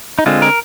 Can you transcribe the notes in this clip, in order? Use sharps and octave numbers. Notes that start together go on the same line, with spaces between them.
D#4
D3 G#3 C4 F4
A#4